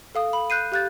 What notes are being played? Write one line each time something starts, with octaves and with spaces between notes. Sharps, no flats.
A4 F5 D#6
B5
F#6 G6 C7 D#7
G4 F5 F#6 G6 A6